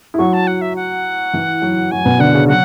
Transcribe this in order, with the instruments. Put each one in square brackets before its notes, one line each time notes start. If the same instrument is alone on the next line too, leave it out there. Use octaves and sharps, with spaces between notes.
[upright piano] E4
[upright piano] F#3 F#4 [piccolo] C#6
[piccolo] A5
F#5
E5
F#5
[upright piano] E3 E4
F#3 F#4
[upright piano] F#3 F#4 [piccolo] G#5
[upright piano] B2 B3
[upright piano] D3 D4 [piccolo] F#5
[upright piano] C#3 C#4
[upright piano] F#3 F#4 [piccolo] F#5